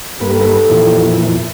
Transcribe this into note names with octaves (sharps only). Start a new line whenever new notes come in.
G2 A#3 D#4 G4 A4 B4
F2 A#2 E3